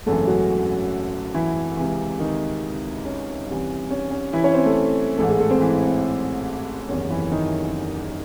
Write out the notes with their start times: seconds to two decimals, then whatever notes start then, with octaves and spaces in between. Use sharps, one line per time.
0.06 G#1 F#2 C#3 E3 A3 A4
0.27 F#3 F#4
1.34 E3 E4
1.77 C#2 C3 E3
2.19 D#3 D#4
3.05 C#4
3.48 C2 C3 E3
3.90 C#4
4.11 C#4
4.33 E3 E4
4.44 C#4 C#5
4.54 C4 C5
4.65 A3 A4
5.18 A1 G#2 E3 A3 A4
5.29 G#3 G#4
5.40 A3 A4
5.50 C4 C5
5.61 E3 E4
5.82 C4
6.89 F#1 E2 C3 D#3 C#4
7.10 E3 E4
7.32 D#3 D#4